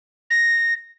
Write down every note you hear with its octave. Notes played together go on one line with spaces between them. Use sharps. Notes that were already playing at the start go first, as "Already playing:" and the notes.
A#6